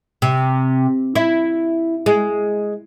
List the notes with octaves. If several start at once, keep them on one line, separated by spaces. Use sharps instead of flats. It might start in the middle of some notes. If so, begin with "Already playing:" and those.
C3
E4
G#3